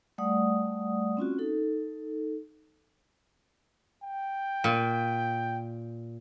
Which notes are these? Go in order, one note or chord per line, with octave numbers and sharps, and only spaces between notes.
G3 A3 D5 F#5 D#6
C4 C#4 F4 F#4
D#4 A4
G5
A#2